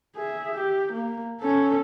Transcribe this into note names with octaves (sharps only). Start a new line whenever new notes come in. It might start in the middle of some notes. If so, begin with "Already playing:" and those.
G#4 E5
G4
A#3
C#4 A4